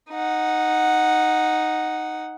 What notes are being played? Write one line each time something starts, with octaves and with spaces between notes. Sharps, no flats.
D#4 F#5